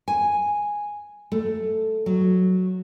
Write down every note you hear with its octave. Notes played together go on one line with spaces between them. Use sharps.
G#5
A3
F#3